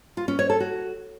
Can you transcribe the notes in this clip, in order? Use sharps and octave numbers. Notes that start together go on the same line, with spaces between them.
F4
C#4
C#5
A4
F#4